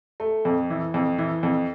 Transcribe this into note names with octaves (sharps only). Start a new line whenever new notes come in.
A3
F2
E3
F2
E3
F2